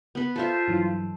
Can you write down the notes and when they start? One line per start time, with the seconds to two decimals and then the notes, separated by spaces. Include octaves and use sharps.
0.15 B3 B4
0.36 F4 A4 C5 E5
0.68 G2 E3 F#3